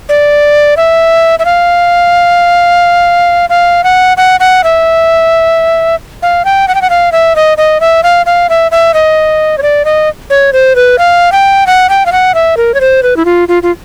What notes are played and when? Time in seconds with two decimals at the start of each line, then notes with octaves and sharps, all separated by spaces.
0.09 D5
0.77 E5
1.39 E5
1.45 F5
3.50 F5
3.84 F#5
4.17 F#5
4.40 F#5
4.64 E5
6.22 F5
6.45 G5
6.68 F#5
6.75 G5
6.82 F#5
6.90 F5
7.12 E5
7.36 D#5
7.58 D#5
7.81 E5
8.03 F5
8.26 F5
8.49 E5
8.72 E5
8.94 D#5
9.58 C#5
9.62 D5
9.85 D#5
10.30 C#5
10.53 C5
10.76 B4
10.99 F5
11.32 G5
11.67 F#5
11.89 G5
12.06 F5
12.12 F#5
12.34 E5
12.57 A#4
12.74 C#5
12.81 C5
13.03 B4
13.17 E4
13.25 F4
13.48 F4
13.63 F4